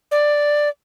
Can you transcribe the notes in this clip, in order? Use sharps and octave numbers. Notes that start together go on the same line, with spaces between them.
D5